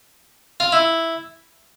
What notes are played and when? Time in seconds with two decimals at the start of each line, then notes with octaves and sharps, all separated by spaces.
0.60 F4
0.72 E4